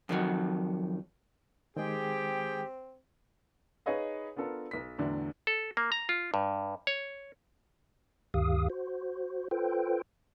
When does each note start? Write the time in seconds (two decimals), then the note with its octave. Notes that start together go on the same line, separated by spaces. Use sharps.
0.09 F2 D#3 F#3
1.77 D#3 G#3 C4 G4 G#4 G5
3.86 D#4 G#4 B4 C#5 D#5 F5
4.36 B3 D4 F4 A4 A#4
4.71 B1 B6
4.99 E2 A2 D3 F#3 D4
5.47 A4
5.77 A#3
5.92 A#5
6.09 F4
6.34 G2
6.87 C#5
8.34 D2 G2 D#3 G4 F5 D#6
8.70 F#4 C5
9.51 F4 A4 B4 C5 G5